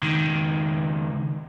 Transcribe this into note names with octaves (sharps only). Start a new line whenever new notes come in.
C#2 D#3